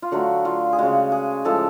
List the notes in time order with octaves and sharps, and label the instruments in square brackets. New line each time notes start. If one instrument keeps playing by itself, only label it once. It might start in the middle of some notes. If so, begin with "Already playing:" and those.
[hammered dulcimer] F4
D3 F#3 A3 F#4
F4
G#4
C#3 G#3 F#4
G#4
A2 F3 G#3 A4